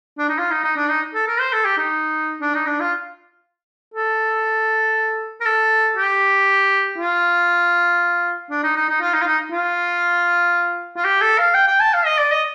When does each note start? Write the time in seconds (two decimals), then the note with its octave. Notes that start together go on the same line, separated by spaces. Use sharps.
0.18 D4
0.29 D#4
0.39 F4
0.51 D#4
0.64 D#4
0.76 D4
0.89 D#4
1.15 A4
1.27 A#4
1.40 C5
1.53 A4
1.65 G4
1.78 D#4
2.41 D4
2.54 D#4
2.66 D4
2.80 F4
3.94 A4
5.41 A#4
5.46 A4
5.97 G4
6.98 F4
8.51 D4
8.63 D#4
8.76 D#4
8.89 D#4
9.01 F4
9.14 D#4
9.22 F4
9.26 D#4
9.52 F4
10.97 F4
11.04 G4
11.21 A4
11.38 F5
11.55 G5
11.68 G5
11.80 A5
11.94 F5
12.05 D#5
12.19 D5
12.31 D#5